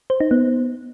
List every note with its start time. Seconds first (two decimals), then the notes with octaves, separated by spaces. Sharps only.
0.10 C5
0.20 D#4
0.31 B3